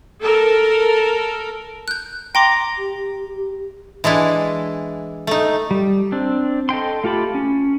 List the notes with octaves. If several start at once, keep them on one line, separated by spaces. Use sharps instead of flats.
A4 A#4
F#6 G6
G5 A#5 C6 D6
G4
E3 G#3 D4 E4
A3 D#4
G3
C4 D4
A4 D#5 G5 C6
A3 F4 G4 A5 B5
C#4